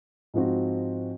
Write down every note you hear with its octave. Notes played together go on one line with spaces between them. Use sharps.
G#2 F3 C4 F#4